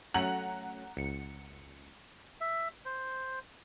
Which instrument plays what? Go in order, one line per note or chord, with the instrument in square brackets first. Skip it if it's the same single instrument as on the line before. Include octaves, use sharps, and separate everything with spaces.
[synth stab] F#3 A3 C#4 [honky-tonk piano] F#5 A#5 F#7
[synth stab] C#2 C#7
[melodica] E5
C5